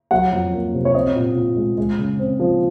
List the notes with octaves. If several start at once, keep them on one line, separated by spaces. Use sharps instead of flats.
F#3 F#5
F2
A#3
C3
C#5
C4 D#5
A#2
A#2
G#3
G#3
C#3
C4
F3